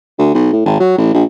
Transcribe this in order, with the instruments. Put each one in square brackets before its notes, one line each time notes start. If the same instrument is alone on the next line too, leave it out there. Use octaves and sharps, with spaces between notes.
[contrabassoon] D2
B1
A2
G#1
F#3
A1
A#1